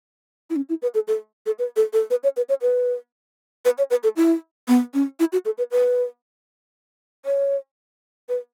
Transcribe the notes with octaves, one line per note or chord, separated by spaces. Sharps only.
E4
C#4
E4
B4
A4
A4
A4
B4
A4
A4
B4
C#5
B4
C#5
B4
B4
C#5
B4
A4
E4
B3
C#4
E4
F#4
A4
B4
B4
C#5
B4